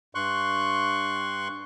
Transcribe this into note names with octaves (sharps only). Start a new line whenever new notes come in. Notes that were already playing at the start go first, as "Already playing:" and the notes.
G2 C6 C#6 F#6